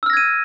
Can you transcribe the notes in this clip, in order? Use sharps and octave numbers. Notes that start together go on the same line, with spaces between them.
E6 F6 G#6 A#6 D#7